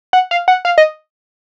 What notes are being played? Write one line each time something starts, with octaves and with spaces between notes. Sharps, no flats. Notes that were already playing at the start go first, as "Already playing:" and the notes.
F#5
F5
F#5
F5
D#5